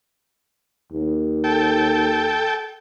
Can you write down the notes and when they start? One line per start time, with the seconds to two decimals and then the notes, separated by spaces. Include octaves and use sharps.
0.92 D#2
1.44 A4 G5